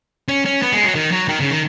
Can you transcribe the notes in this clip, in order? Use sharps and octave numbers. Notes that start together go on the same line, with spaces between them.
C#4
C#4
B3
G#3
F#3
D#3
F#3
D#3
C#3
D#3